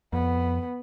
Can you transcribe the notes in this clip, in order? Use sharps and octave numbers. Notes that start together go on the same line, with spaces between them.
F2 B3